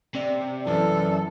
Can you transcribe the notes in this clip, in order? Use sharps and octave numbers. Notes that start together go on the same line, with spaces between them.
C3 D5
F#2 E3 A4